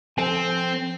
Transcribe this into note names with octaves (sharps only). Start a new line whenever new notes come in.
F3 C4 A4 G#5